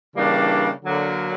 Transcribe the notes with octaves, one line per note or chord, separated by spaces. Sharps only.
C#3 E3 G3 A#3 D4
D3 F#3 A#3